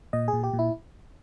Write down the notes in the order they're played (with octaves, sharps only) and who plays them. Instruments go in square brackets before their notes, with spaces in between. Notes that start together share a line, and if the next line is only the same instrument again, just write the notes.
[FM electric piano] A#2 D#5
G#4
A#2
G4
A#2
E4